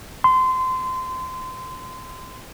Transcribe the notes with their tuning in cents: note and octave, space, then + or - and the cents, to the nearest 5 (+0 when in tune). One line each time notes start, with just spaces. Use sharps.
C6 -25